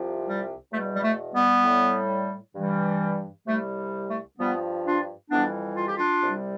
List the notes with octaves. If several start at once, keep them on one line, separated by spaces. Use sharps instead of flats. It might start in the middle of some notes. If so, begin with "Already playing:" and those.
Already playing: C2 C3 F3
G3
E2 B2 G3 A3
G3
A3
G3 B3
A2 G3
G2 E3 G3
C2 C3 G3 A3
A3
G2 F3 G3 B3
D4 F4
F2 E3 G3 B3 D4
F4
G4
D4 F4
C2 C3 G3